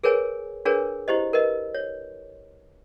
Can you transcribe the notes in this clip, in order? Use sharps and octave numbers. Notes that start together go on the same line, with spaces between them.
G#4 A#4 B4 C#5 G#5
D4 G#4 A#4 B4 C#5
E4 G4 C5 D#5
A#4 B4 D#5
C#5